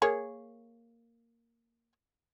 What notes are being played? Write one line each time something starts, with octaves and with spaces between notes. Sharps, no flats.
A#3 G#4 C#5